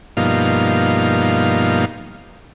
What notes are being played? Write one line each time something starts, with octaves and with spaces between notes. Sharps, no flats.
G2 B2 F3 A#3 D#4 F5